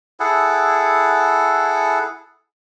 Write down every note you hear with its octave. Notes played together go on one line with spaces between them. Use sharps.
E4 G#4 A4 F#5